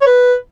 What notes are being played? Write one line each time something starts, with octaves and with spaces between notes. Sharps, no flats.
C#5
B4